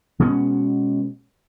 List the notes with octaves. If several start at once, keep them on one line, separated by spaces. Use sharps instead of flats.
B2 G#3 B3 C#4